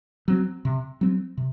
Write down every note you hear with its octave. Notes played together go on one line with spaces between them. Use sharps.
F#3 C4
C3
F#3 C4
C3